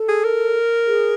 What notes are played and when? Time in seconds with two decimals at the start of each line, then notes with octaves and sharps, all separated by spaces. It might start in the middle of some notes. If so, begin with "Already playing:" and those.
Already playing: A4
0.08 G#4
0.24 A#4
0.87 G#4